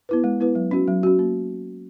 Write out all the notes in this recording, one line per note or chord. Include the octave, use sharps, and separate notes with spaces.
B3 E4 B4
G#3
B3 E4 B4
F#3
C#4 F#4
F#3
C#4 F#4
A#3